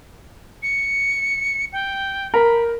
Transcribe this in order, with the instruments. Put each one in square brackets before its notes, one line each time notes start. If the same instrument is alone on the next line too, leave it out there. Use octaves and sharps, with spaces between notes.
[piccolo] C#7
G5
[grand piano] A#4 [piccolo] B5